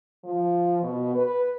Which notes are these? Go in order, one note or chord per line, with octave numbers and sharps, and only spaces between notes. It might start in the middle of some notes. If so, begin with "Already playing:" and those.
F3
B2
B4